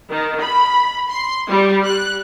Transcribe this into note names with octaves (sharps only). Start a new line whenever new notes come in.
D#3
B5
C6
G3
F#6